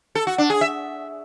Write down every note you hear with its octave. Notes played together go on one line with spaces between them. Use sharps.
A4
F#4
D4
G#4
E5